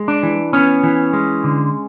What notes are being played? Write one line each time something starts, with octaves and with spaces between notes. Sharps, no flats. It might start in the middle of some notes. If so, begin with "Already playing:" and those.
Already playing: G#3
D4
E3
B3 C#4
E3
G#3
D3